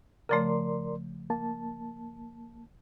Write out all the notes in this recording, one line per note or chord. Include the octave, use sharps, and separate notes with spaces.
C#3 F3 A3 A#4 D5 C6
A#3 A5